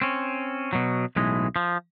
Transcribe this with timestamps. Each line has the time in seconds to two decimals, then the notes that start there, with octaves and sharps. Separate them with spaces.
0.02 C4 C#4
0.73 B2 F#3
1.16 B1 A2 E3 G#3
1.56 F3